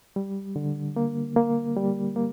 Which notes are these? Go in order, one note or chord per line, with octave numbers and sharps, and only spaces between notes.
G3
D3
A#3
A#3
G3
A#3